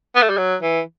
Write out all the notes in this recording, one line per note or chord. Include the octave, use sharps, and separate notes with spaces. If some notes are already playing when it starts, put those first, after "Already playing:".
B3
A3
G3
F#3
E3